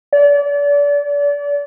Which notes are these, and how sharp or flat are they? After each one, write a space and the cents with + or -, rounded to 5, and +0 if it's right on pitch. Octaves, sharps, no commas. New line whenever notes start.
D5 -35